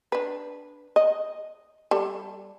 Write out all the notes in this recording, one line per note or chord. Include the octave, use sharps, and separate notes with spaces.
D4 B4
D#5
G3 A4